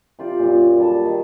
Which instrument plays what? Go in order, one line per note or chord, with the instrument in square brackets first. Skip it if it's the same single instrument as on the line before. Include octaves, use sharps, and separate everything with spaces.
[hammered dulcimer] C3 F4 G4 D5
F#2 A#2
G3 A4 A5
D#3